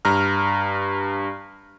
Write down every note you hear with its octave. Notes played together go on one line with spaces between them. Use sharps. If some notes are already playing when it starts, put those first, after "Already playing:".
G2 A#5 F6